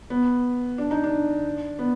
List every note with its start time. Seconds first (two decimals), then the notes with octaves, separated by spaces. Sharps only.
0.10 B3
0.78 D4
0.91 D#4
1.04 D4
1.79 B3